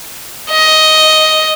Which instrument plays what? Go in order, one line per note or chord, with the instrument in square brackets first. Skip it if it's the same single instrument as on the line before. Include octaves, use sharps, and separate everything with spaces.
[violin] D#5